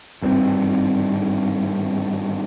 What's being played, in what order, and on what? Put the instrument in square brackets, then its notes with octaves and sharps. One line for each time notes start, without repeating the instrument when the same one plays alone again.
[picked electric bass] G#1 G2 C#3 C4